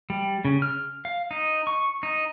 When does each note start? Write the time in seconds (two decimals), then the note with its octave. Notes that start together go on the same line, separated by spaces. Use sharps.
0.10 G3
0.45 C#3
0.62 F6
1.05 F5
1.31 D#4
1.67 C#6
2.03 D#4